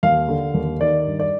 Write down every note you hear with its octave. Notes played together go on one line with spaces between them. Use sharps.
D#2 F5
D3
D#2
D#3 D5
G2
D5